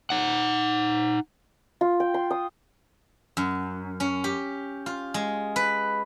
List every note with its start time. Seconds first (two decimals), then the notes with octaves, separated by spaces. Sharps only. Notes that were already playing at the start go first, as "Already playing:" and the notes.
0.10 D#4 F#5
1.81 F4
2.00 G5
2.14 C6
2.30 D#6
3.37 F#2
4.00 C#4
4.24 G4
4.86 F4
5.14 G#3
5.56 B4